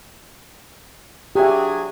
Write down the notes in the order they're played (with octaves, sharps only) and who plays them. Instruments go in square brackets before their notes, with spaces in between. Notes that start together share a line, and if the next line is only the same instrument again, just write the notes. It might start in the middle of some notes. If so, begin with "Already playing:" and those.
[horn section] F#3 D4 G#4 [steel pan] G4 E5